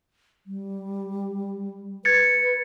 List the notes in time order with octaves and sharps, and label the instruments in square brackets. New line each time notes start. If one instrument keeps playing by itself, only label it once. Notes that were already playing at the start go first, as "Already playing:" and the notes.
[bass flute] G3
[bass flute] B4 [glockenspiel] G#6 A6 C#7